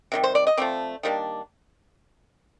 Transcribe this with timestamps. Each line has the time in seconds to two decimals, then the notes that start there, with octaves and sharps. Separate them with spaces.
0.12 C3 D#3 G3
0.24 C5
0.35 D5
0.47 D#5
0.57 F3 A3 C4 D5
1.03 D#3 G3 A#3 D4